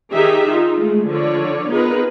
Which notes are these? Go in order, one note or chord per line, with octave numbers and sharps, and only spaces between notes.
D#3 D#4 G4 G#4 E5
D#4 F4
G#3 A3
D3 F3 C#5 D5
B3 D#4 F4 G#4 A#4 B4